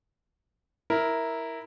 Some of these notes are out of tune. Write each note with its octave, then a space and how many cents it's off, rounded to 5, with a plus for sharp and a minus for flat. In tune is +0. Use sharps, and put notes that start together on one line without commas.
E4 -10 A#4 +0